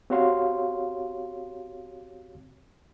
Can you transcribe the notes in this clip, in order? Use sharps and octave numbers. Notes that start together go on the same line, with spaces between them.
C4 F#4 G4 C#5 F5 C6